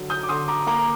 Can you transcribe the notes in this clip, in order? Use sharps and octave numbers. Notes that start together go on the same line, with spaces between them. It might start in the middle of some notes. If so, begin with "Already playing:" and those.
Already playing: D3 F#3
D#6 G6
D6
D3 C6 D#6
A#5 D6
A#3 A#5 D6